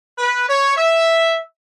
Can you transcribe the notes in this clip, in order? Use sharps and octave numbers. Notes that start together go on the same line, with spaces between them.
B4
C#5
E5